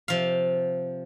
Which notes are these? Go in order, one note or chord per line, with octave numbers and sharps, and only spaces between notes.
C3 F3 F5